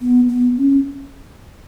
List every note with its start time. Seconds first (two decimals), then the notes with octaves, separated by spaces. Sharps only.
0.01 B3
0.29 B3
0.57 C#4